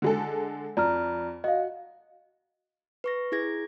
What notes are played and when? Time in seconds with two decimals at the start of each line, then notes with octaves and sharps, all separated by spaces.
0.02 D3 G#3 A4
0.77 F2 D5 A#5 F6
1.44 F#4 D#5 F5
3.04 B4 C#6 A#6
3.32 E4 G#4 G#6 A#6